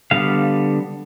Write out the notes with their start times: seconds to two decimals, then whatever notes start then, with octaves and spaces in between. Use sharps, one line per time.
0.11 D3 G3 B3 F5